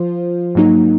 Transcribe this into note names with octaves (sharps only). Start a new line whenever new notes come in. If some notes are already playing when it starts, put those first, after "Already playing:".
Already playing: F3 F4 C5
G#2 F#3 A#3 D#4